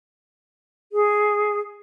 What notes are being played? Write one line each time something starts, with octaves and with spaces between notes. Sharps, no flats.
G#4